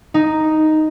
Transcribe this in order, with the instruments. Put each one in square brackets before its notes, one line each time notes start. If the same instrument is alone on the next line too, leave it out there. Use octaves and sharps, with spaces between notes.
[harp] D#4